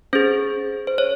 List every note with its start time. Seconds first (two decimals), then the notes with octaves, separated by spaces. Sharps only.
0.13 C#4 G#4 C5
0.87 C5
0.98 C#5